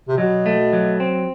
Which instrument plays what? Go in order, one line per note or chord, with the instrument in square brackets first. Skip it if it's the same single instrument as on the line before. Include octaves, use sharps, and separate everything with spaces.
[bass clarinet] C3
[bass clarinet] B2 [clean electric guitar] F#3
[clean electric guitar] A3
F#3
C4